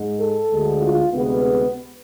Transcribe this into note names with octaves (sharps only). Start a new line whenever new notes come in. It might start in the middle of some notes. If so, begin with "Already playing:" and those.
Already playing: G#2 G#3
A4
D2 D3 G#3
F4
D2 C3 G#3 B3